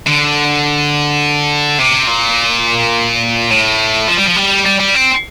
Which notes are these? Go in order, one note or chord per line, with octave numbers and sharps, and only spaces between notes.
D3
C3
A#2
A2
F3
G3
F3
G3
G3
G3
C4